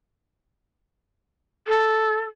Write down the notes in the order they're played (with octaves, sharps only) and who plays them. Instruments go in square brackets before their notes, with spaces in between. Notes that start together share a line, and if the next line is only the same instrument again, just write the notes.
[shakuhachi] A4